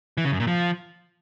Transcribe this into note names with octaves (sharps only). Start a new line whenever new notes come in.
E3
C#3
F#2
A#2
F3